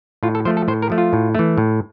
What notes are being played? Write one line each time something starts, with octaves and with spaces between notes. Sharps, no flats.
A2 F4
A4
F3 A3 C5
A4
A2 C5
A#4
F3 A3
F4
A2
E3 A3
A2